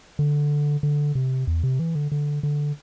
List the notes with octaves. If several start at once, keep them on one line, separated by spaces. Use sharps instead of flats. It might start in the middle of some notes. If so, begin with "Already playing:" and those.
D3
D3
C3
E2
C3
E3
D3
D3
D3